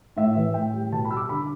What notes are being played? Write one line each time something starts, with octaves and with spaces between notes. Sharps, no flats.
A2 E5
E3
A2 G5
G3
B2 A5
B5
G3 E6
D6
D3 B5